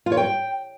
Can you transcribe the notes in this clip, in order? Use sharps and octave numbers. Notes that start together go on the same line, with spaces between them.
F4
C#5
G5